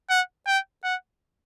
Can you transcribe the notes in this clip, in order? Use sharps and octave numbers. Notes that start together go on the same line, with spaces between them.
F#5
G5
F#5